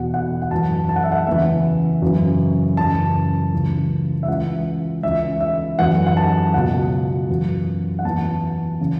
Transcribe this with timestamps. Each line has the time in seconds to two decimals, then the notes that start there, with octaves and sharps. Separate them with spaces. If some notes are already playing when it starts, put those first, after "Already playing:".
Already playing: E2 B2 F#5
0.14 F#5
0.42 F#5
0.51 F#2 E3 A5
0.89 A5
0.96 F#5
1.04 E5
1.12 F#5
1.27 E2 C#3 E3 E5
2.02 F#2 C#3 E3
2.77 F#2 C#3 E3 A5
3.53 C#2 C#3 E3
4.23 E5
4.28 C#2 C#3 E3 F#5
5.03 C#2 C#3 E3 E5
5.41 E5
5.79 F#2 E3 F#5
6.07 F#5
6.17 A5
6.54 C#2 B2 F#5
7.30 F#2 E3
7.99 F#5
8.05 E2 E3 A5
8.81 C#3 E3